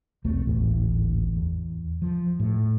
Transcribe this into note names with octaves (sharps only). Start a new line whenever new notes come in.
B1 E2 A3 C4
G#1 D2 A2 E3
E2
F3
A2